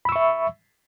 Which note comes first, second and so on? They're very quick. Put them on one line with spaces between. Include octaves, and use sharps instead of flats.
B5 E6 C#6 E5